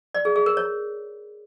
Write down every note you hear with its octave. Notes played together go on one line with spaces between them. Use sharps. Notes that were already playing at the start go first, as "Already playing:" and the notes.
D5
G#4
G#4
A#4
C#5